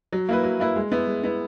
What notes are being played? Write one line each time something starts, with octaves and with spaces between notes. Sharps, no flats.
F#3
A#3 E4 B4
F#3
A#3 E4 B4
G#3
B3 E4
G#3
B3 E4